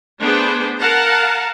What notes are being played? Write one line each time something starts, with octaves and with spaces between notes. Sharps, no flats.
A3 B3 D4 G#4 B4 C5
A#4 F5 F#5 A5 A#5